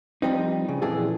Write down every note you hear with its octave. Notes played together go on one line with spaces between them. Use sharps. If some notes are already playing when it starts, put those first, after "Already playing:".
F3 G3 C4 D#4
C#3
F2 A#2 E3 G#4 A4